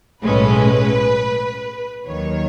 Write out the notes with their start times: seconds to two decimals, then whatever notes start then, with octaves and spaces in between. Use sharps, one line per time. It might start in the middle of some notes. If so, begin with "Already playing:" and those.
0.22 B1 A2 G#3 C#4 B4
2.07 D#2 D#3 F#3 C#5